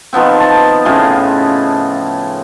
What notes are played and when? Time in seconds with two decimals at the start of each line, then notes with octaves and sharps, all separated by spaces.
0.13 D#3 F3 B3 C4
0.40 A5
0.85 A2 C#3 F3 G#4